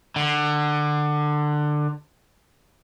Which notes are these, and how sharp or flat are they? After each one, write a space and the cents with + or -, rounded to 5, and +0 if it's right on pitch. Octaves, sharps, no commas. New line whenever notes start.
D3 +20